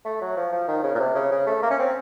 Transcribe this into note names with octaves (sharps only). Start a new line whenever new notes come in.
A3
F#3
F3
F3
D#3
C#3
A#2
C3
C#3
C#3
A3
A#3
C#4
C4